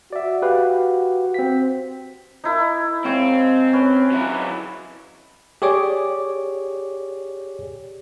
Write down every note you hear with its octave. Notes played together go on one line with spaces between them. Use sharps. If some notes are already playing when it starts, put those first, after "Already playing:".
F#4 D5 E5
G4 B4 F5
C4 B6
D#4 E4 A#4
G#3 C4 C#5 F5
C#4 B4
F#3 E4
G4 G#4 C#5 D5 D6